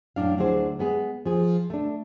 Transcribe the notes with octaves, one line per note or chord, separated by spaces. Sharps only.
F#2 A2 D4 F5
D2 F#3 D4 E4 G#4 C5
G#3 B3 G#4
F3 G#4
A3 D4